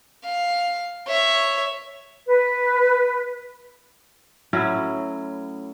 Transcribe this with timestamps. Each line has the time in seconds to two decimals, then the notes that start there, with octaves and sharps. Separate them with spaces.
0.24 F5
1.07 C#5 E5
2.27 B4
4.53 A2 F#3 C#4 E4